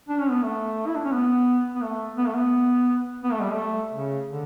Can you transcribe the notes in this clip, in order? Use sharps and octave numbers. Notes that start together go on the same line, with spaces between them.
D4
C#4
B3
A3
E4
D4
C#4
B3
B3
A3
B3
A3
B3
B3
A3
G3
A3
C#3
D3